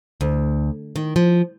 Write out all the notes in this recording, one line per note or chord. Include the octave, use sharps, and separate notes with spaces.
D2
D#3
F3